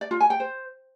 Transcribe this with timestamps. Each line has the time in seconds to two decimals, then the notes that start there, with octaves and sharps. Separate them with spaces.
0.01 D5
0.11 F4
0.20 G#5
0.30 G5
0.40 C5